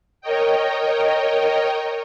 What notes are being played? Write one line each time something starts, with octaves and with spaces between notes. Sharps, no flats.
A#4 C#5 D#5 G5